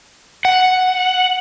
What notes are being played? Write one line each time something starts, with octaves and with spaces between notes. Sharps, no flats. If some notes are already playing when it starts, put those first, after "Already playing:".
F#5